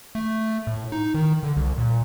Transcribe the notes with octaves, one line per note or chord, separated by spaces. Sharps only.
A3
A2
D#4
D#3
D3
C2
A#2